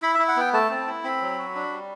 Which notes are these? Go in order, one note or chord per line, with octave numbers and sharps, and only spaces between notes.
E4 B5
E5
E4
F#5
B3 G5
A3 A5
C4
E4
C4 B5
F#3
F#4
D4
G3